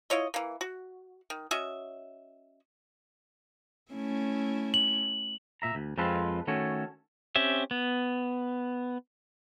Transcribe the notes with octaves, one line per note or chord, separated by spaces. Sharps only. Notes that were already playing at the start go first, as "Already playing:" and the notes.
E4 F4 C#5 D#5
E3 A#3
F#4
D#3
C#4 F#4 D#5 E5
A3 C#4 E4
F#7
A#2 E5 A#5
D2
F2 G#3 C4 F4 A4 B4
D#3 A3 C#4 F#4 A4 C#5
C4 C#4 G4 E5
B3